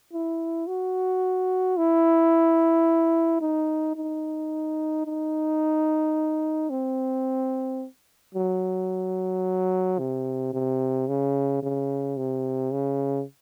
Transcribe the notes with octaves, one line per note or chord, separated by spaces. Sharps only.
E4
F#4
E4
D#4
D#4
D#4
C4
F#3
C3
C3
C#3
C#3
C3
C#3